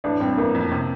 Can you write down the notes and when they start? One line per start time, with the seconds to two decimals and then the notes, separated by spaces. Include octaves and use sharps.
0.04 A1 D4
0.20 G2 C4
0.37 A1 A#3
0.55 F2
0.72 C3